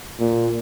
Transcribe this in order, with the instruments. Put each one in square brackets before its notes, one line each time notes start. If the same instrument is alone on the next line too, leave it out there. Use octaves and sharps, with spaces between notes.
[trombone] A#2